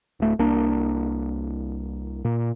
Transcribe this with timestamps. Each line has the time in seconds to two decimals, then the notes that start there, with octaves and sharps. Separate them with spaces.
0.20 D1 A3
0.39 C2 A#3 D4
2.25 A#2